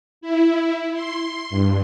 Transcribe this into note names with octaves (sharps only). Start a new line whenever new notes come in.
E4
C6
G2